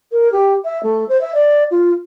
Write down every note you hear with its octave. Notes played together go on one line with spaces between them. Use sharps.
A#4
G4
E5
A3
C5
E5
D5
F4